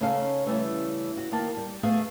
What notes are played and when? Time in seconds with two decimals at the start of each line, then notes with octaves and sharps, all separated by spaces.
0.01 C#3 C#4 D#4 G#4 A4 F5
0.46 C#3 E3 G3 A3 C#4
1.17 F#4
1.32 D#3 A#3 A5
1.57 G3
1.83 A3 B3 G#4 A4 F5